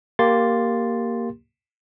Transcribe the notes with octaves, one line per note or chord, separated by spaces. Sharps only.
A#3 G4 C6 A6